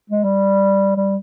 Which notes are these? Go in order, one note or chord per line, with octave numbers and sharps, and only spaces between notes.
G#3
G3
G3